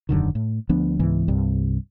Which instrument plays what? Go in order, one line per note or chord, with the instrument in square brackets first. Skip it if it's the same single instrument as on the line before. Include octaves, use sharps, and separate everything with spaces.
[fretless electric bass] E1 F#2 D3 D#3
A2
D2 F3 B3 D4
C#2 G#2 E3 B3
C2 G2 C3